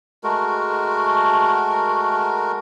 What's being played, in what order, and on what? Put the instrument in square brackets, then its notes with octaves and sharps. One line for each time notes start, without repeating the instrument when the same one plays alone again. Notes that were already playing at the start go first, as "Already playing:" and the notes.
[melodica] G#3 A3 F#4 A#4